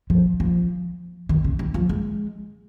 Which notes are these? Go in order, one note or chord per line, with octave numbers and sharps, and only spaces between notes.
F3
F3
D#3
C#3
D#3
F3
G#3